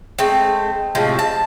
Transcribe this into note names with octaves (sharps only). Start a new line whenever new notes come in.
G#3 A3 C4
A2 C3 F3 G#3
A5